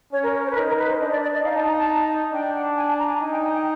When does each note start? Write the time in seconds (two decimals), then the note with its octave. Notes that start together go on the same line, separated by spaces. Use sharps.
0.12 C#4 C#5
0.23 A#4
0.34 C#5
0.45 C5
0.51 B4
0.56 D#4 A#4
0.68 A#4
0.78 B4
0.90 C5
1.00 D4 D#5
1.11 D5
1.22 D5
1.33 D#5
1.44 D#4 F5
1.55 A5
1.67 A#5
1.77 A5
2.33 D4 G5
2.55 F#5
2.77 G#5
2.88 A5
2.99 A#5
3.09 G#5
3.20 D#4 G#5
3.32 G5
3.43 G#5
3.54 G5